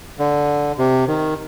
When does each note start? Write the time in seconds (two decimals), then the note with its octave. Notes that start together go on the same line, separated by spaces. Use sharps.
0.19 D3
0.78 C3
1.08 D#3